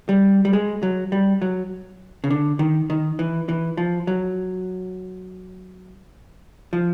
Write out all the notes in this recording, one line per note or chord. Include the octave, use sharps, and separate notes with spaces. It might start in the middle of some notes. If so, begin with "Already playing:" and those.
G3
G3
G#3
F#3
G3
F#3
C#3
D3
D#3
D#3
E3
E3
F3
F#3
F3